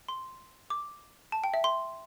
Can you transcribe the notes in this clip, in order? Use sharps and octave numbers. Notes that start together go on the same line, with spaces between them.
C6
D6
A5
G5
E5
C6